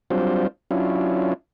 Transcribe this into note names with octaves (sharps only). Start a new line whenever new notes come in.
F#3 G3 C4 D4 F4 C5
F#3 C#4 D4 E4 F4